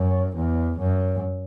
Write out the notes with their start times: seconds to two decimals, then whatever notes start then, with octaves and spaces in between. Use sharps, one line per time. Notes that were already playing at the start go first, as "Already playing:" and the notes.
Already playing: F#2
0.36 E2
0.79 F#2